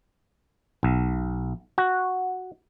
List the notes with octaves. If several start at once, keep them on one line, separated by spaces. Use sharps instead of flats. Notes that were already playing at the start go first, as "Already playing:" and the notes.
B1
F#4